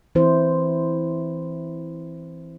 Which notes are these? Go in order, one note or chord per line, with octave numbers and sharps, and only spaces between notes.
E3 C4 E4 C5